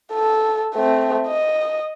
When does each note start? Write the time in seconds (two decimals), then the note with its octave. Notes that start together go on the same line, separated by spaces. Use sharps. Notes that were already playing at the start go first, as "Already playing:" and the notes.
0.12 A4
0.75 A3 C4
1.27 D#5